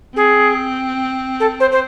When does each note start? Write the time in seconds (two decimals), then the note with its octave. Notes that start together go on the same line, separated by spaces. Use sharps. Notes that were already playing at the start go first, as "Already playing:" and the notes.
0.16 C4 G#4
1.40 A4
1.60 C5
1.72 C5